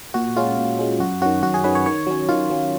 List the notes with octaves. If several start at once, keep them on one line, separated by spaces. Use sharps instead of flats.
A#2 F#4
G#3 C#4 F4
A#2
G#3 C#4
F#2 F#4
D#3 F#3 C#4 F#4
F#2 F#4
G#4
D#3 F#3 C#4 B4
C#5
D#3 C#5
F#3 C#4
D#3 F4
F#3 C#4